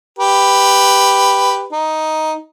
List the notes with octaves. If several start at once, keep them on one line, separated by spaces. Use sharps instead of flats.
G4 B4
D#4